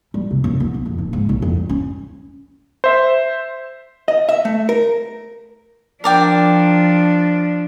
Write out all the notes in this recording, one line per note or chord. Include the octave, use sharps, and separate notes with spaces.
G3
C3
F#2
B3
A#1
F2
D#1
G#2
B1
F2
G3
C#4
C5 E5
D#5
E5
A3
A#4
F3 D4 A#4 D5 G5